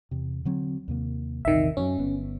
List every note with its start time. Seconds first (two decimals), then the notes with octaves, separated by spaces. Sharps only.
0.11 E2 C3
0.45 D3 F#3 C4
0.88 D#2 C3 A#3
1.45 A#1 E2 C3 D#3 E5
1.77 F#2 D#3 F#3 C#4
1.98 G1 B3